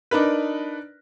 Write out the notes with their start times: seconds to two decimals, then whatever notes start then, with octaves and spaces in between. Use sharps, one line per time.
0.11 D4 D#4 A#4 B4